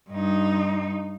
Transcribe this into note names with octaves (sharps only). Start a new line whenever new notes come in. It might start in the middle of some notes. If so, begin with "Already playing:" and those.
G2 D#4